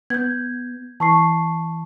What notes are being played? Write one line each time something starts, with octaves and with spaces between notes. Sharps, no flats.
B3 G6 G#6
E3 A5 C#6 C7